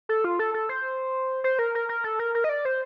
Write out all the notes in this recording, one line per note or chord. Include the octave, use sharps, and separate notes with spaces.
A4
F4
A4
A4
C5
C5
A#4
A#4
A#4
A4
A#4
A#4
D#5
D5
C5